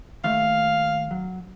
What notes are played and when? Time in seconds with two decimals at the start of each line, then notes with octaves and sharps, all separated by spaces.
0.24 D#2 A3 E5 F5
1.11 F#3